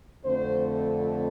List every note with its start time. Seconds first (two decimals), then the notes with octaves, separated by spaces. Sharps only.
0.24 F2 D3 A3 C4 C5